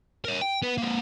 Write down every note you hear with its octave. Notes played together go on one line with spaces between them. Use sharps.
A#4 C#5
G5
B3 B4
A#3 C4